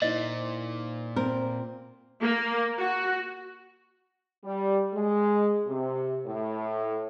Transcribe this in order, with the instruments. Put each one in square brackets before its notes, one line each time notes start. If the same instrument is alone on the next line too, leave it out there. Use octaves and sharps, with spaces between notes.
[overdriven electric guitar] A#2 [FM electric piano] D#4 E4 C5 [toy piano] D#5
[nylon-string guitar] C4 A#4
[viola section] A#3
F#4
[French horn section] G3
G#3
C3
A2